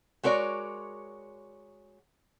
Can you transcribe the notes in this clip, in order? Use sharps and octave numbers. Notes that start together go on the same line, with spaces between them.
G#3 F#4 A#4 C#5 D5